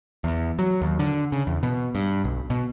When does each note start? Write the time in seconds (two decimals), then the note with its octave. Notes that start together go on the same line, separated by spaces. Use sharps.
0.24 E2
0.59 F#3
0.81 D#2
0.99 D3
1.32 C#3
1.47 E2
1.63 B2
1.95 G2
2.24 B1
2.50 B2